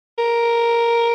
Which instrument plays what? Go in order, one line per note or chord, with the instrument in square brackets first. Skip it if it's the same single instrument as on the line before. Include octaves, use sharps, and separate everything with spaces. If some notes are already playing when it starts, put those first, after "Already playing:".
[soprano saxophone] A#4